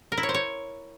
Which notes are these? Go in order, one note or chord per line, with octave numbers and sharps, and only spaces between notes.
A#4
E4
C#5
C5
C#5